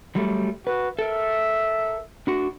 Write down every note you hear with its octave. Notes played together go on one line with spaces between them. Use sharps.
F#3 G3 A3
F#4 B4
A4 A#4 E5
D4 F#4